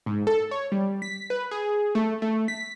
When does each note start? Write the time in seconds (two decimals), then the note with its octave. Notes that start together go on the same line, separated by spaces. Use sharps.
0.06 G#2
0.27 A4
0.51 C#5
0.72 G3
1.02 B6
1.30 B4
1.51 G#4
1.95 A3
2.22 A3
2.48 B6